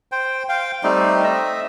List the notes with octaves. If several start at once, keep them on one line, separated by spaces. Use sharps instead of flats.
C5 G5
F5 G5
G3 A3 C4 D#4
D#5 E5